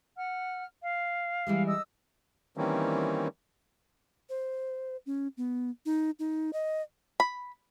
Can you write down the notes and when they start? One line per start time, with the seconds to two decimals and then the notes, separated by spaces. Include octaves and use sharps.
0.17 F#5 F6
0.82 F5
1.47 E3 G3 G#3
1.67 D#5 D#6 E6
2.57 D#3 E3 G3 A#3 C4 C#4
4.29 C5
5.06 C#4
5.37 B3
5.86 D#4
6.19 D#4
6.53 D#5
7.20 B5